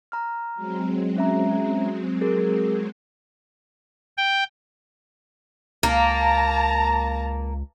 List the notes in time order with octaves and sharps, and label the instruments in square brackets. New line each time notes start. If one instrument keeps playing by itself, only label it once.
[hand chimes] A#5 F6
[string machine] F#3 G#3 C4
[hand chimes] C#4 E5 A#5
G#4 A#4
[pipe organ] G5
[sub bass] C#2 [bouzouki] A#3 [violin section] A5 A#5